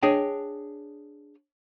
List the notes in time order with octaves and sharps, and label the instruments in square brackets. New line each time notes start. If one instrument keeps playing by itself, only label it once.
[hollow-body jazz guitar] D4 G#4 C#5 D#5 G5